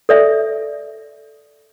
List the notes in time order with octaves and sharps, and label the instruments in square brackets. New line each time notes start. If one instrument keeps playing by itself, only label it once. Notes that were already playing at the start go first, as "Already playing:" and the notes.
[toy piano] A4 D5 E5